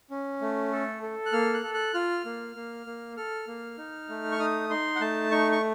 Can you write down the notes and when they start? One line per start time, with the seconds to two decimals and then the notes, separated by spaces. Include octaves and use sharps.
0.10 C#4
0.41 A3
0.72 A4
1.03 A4
1.26 F#6
1.33 A#3 F6
1.54 F#6
1.63 A4
1.74 F#6
1.94 F4 F6
2.25 A#3
2.56 A#3
2.86 A#3
3.17 A4 F6
3.48 A#3
3.78 D#4
4.09 A3
4.32 C#6
4.39 D#4 D#6
4.70 D#4 C6
4.96 F#5
5.01 A3 A5
5.31 D#4 C#6
5.52 C#6